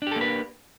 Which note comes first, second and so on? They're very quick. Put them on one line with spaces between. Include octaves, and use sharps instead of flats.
D4 G4 A4 A#3 B4